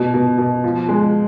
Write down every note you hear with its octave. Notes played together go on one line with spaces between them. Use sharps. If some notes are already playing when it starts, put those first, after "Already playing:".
Already playing: B2
B2
B2
F3
G#3